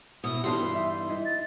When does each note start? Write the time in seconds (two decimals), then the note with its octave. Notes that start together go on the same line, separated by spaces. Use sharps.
0.24 B2 E4 D#6
0.44 G2 E3 G3 F#4 A4 C6
0.61 B4
0.75 D#4 E5
1.09 D#4 E4 D#5
1.25 A6